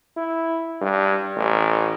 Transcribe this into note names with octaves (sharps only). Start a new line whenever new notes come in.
E4
G2
A1